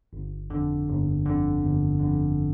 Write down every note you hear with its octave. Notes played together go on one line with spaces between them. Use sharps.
G1
F2 D3
G1
F2 D3
G1
F2 D3